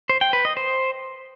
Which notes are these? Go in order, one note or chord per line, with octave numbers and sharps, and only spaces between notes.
C5
G5
B4
D#5
C5